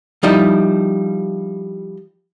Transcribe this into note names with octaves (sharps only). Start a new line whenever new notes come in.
F3 G3 D#4 E4